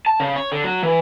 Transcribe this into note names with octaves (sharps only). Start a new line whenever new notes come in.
A5
C#3
C#5
D3
F#3
E3